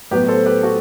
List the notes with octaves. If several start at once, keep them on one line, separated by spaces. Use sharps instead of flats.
A2 F#3 B3 G4 B4
A4 C5
G4 B4
F#4 A4